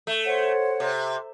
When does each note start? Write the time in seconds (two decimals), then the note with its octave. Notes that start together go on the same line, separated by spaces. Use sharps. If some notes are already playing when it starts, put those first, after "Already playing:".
0.07 A3
0.26 C5 C#5 F#5
0.80 C3